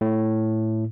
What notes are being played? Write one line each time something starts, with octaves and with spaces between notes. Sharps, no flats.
A2